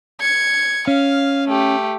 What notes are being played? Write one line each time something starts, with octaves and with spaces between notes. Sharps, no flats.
G#6 C#7
C#4 F5
A3 G4